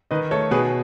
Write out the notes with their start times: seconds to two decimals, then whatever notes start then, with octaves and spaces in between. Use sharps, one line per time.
0.11 D#3 B4 D#5
0.31 A3 A4 C#5
0.51 B2 G#4 B4